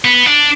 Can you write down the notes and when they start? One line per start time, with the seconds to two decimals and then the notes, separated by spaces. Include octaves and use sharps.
0.05 B3
0.26 D4